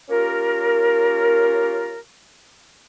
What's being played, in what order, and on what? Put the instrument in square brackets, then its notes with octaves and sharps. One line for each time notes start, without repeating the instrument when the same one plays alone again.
[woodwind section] A#3 C#4 F4 G4 A#4